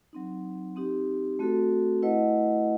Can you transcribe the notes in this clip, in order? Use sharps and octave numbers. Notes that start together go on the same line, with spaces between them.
F#3 C4 D#4
C4 D#4 G4
A3 C4 F#4 A4
A3 E4 B4 D#5 F#5